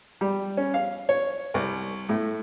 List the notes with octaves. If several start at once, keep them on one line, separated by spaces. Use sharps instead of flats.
G3
C#4
F5
C#5
C2
A2